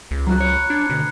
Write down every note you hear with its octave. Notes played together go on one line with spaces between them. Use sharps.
C#2
F#3 F4 F#4 A#5 F#6
C#5 B5 F#6 C#7
D4 G#6 C7
D2 B2